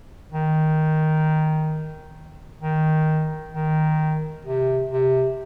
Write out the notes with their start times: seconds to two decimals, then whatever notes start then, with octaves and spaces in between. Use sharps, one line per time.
0.32 D#3
2.61 D#3
3.53 D#3
4.45 C3
4.91 C3